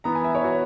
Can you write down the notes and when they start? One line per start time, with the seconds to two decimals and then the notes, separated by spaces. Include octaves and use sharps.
0.04 E3 B3 A#5
0.15 G#5
0.24 E5
0.35 C#5
0.44 F#4